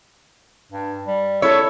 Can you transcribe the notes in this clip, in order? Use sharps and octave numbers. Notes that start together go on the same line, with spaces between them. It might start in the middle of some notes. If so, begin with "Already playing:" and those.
G2
G3
E4 A4 C#5 E5